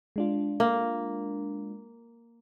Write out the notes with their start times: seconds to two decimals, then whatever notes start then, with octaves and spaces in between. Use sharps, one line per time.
0.16 G#3 D4 F4
0.60 A#3